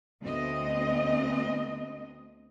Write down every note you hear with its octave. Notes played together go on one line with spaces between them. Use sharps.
D2 B3 C4 D#5